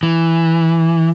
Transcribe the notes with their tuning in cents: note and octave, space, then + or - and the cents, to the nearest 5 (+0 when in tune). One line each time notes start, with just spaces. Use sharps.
E3 +0